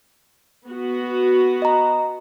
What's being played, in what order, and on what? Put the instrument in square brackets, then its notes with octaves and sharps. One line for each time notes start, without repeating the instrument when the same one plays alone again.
[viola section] B3 F#4
[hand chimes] D#5 A#5